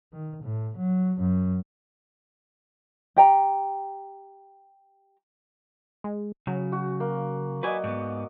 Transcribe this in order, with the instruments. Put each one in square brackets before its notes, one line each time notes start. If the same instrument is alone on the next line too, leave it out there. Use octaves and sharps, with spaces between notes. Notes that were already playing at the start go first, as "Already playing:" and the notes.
[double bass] D#3
A2
F#3
F#2
[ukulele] G4 G5 A#5
[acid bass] G#3
[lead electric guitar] C#3 [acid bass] F#3
[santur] F#4
A#3
[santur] F#4 D5 D#5 [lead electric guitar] B4 G#5
[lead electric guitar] G#2 B3